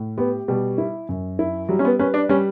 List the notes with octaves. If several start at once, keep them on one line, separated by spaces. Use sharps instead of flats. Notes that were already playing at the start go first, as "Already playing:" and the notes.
Already playing: A2
B3 G4
B2 G3
E4
F#2
E4
F#3 G3
C#4
B3
C#4 B4
D4
G3 C#4